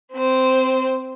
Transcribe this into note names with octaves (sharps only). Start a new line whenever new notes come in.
C4 C5